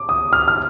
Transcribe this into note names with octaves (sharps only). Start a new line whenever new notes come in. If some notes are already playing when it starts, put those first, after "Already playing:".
Already playing: D6
D#6
F6
F6